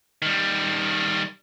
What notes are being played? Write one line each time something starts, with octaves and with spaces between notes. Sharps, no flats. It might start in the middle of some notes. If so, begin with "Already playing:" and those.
D#3 G3